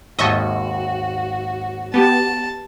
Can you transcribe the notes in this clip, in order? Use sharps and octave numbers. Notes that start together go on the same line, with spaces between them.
G#1 D#2 F#4 D#5 E5 A5 C#6
B3 G4 A5